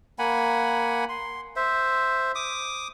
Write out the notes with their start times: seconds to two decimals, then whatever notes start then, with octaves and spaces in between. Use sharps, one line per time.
0.19 A#3 F#5 G#5 B5
1.09 C6
1.56 C5 E5
2.35 D6 D#6